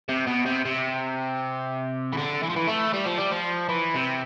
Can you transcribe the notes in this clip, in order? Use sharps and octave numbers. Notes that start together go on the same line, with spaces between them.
C3
B2
C3
C3
E3
D3
E3
F3
E3
A3
G3
F3
G3
F3
E3
C3